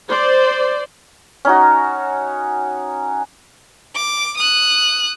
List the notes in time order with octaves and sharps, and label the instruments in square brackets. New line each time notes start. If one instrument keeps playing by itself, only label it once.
[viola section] C5 D5
[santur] C#4 D#4 F#4
[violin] D6
D#6 F#6